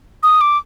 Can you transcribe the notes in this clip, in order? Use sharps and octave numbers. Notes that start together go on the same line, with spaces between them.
D#6
D6